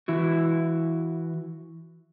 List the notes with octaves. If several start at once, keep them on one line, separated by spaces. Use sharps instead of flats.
E3 E4 F#4